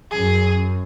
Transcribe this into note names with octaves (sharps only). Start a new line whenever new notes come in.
F#2 G#4